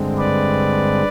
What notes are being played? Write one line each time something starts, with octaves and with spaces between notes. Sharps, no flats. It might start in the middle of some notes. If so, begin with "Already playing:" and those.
Already playing: G2 D3 G#3 C4
B4 D5